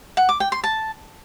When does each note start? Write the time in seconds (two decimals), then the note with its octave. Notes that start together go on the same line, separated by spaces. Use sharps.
0.17 F#5
0.29 D6
0.40 G5
0.52 C6
0.64 A5